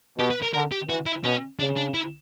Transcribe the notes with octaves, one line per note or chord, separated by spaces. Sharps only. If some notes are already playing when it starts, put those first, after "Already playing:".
B2 G4
B4
A#4
D3 A#4
G4
E3 F#4
E4
B2 C#4
C#3 D4
D4
E4